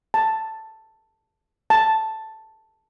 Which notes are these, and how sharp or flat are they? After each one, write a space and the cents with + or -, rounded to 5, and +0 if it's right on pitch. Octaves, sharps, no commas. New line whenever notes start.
A5 +5
A5 +0